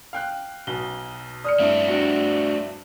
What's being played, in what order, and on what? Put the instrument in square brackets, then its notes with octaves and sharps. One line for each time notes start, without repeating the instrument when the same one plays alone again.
[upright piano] F5 G5 F#6
[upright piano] B1 B2 [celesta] G7
[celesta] D5 [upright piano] D#6 F6 C#7
[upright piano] G2 E4 [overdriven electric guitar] A3 C4
[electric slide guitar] D4 F#4